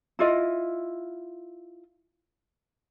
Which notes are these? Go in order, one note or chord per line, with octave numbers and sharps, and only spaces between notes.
E4 F4 D#5